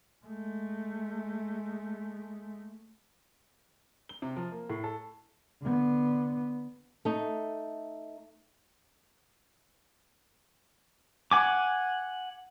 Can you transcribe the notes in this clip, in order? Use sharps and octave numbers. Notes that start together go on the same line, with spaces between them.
G#3 A3
G7
C3
F3
A#3
A2
A4
D3 B3
A3 D#4
F#5 G#5 D6